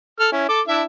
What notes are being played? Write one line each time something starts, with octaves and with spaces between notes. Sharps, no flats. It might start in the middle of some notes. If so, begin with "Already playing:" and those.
A4 F6
C#4 E4
A4 D6
D4 E4 E5